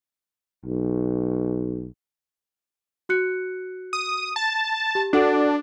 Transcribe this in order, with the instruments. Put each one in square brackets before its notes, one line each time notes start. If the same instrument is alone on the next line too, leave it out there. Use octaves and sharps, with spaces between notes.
[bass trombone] B1
[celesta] F#4 F#6 C#7
[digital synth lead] D#6
A5
[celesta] G4
[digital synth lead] D4 [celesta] F#4 A4 F#5